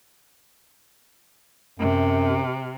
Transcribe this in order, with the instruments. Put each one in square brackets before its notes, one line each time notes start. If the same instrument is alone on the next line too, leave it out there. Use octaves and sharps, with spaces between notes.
[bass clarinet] F#2 [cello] C3